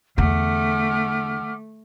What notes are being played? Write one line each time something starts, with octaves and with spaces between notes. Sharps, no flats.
E2 D3 A3 F#5 D6 F6